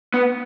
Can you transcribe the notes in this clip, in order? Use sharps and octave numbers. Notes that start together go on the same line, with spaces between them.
B3